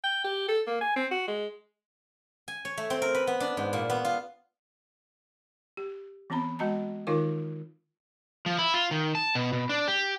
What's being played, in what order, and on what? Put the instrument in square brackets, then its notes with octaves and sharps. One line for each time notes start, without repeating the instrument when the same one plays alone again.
[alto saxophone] G5
G4
A4
A#3
G#5
C4
F#4
G#3
[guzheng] G#5
C#5
A3
C4
A#4
B4
B3
D4
G#2
A#2
B3
F4
[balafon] G4
E3 B3 C4 A#5 B5
G#3 F#4 D#5 A5 A#5
D#3 D#4 F4 A#4 F5 D6
[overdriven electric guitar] F3
E4
F4
D#3
A5
B2
B2
D4
G4